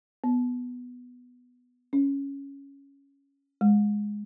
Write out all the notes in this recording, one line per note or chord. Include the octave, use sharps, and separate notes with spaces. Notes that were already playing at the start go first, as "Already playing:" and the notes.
B3
C#4
G#3